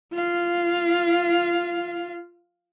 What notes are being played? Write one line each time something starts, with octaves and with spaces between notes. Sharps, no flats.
F4 F5